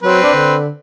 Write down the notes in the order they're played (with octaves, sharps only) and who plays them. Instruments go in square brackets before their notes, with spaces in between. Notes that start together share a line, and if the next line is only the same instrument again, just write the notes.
[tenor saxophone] F#3 [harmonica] C4 B4
[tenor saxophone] D4
D3